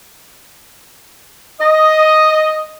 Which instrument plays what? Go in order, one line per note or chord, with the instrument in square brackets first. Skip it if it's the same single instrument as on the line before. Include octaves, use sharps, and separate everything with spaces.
[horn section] D#5